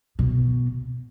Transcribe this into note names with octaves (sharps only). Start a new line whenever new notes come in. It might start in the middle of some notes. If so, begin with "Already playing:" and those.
B2